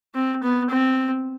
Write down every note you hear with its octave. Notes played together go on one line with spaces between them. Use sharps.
C4
B3
C4